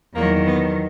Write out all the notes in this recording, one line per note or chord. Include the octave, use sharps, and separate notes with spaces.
E2 D#3 F#3 A#3
B3